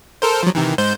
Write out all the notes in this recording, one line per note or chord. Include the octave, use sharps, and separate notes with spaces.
A4 A#4 C5
F3 F#3
C3 D#3 E3
G#2 C5 G6